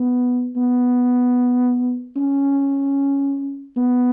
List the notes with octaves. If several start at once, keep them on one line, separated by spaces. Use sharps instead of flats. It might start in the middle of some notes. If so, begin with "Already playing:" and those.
Already playing: B3
B3
C#4
B3